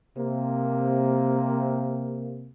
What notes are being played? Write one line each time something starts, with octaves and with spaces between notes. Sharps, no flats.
C3 A#3